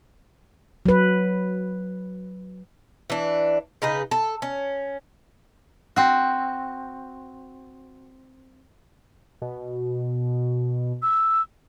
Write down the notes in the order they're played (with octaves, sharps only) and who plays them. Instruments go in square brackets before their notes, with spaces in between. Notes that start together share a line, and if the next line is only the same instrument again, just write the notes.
[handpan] F#3 B4
[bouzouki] E3 D4
C#3 D#4 G#4 B4
A4
C#4
[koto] C4 F#4
[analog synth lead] B2
[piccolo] E6